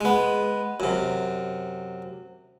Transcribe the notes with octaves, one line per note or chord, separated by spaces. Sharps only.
G#3 B3
F#2 C3